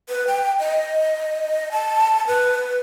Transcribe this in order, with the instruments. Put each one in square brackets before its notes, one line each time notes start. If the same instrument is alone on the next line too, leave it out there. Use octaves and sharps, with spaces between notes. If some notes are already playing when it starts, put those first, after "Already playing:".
[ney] B4
G5
D#5
A5
B4